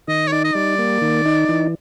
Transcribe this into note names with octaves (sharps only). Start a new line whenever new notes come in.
D#3 D#5
C#5
D#4 D5
D#5
G3 D5
A#3
D#3
D#4
E3